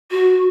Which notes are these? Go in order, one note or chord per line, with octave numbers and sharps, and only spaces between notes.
F#4